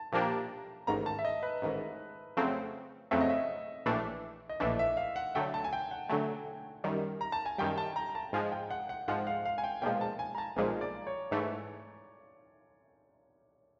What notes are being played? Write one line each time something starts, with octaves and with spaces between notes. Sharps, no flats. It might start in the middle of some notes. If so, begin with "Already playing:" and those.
Already playing: A5
A#2 F3 A#3 D4 G4 A5
A#5
A5
A1 G#2 D#3 A#5
A5
E5
D#5
B4
A1 G#2 D#3
F2 C#3 F#3 A3 C4
F2 C#3 F#3 A3 C4 E5
D#5
E5
A#1 A2 E3 A3 D4
D#5
A#1 A2 E3 A3 D4 E5
E5
F5
F#5
D3 F#3 A3 G5
A5
G#5
G5
F#5
D3 F#3 A3 G#5
F#2 D#3 G3
A#5
A5
G#5
F#2 D#3 G3 G5
A5
A#5
A#5
A5
G#2 F3 G#3 G#5
G5
F#5
F#5
G#2 F3 G#3 F#5
F5
F5
G#5
G5
B1 A#2 F3 G#3 G5
A5
G#5
A#5
A5
B1 A#2 F3 G#3 G#5
D5
C#5
G#2 E3 A3